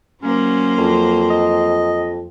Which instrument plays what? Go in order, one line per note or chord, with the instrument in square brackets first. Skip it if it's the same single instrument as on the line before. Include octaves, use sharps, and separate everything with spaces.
[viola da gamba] F#3 A#3 C5 [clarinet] C#4
[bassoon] F2
[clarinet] D#5